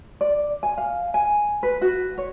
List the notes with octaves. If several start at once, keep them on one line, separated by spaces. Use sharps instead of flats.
D5
G#5
F5
G#5
B4
F#4
C#5